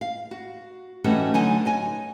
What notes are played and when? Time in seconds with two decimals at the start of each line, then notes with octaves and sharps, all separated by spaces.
0.01 F5
0.31 F#4
1.04 E3 G3 A3 C#4 D#4 F#4
1.34 D3 F#3 D#4 G#5 A5
1.65 C#5 D#5 G#5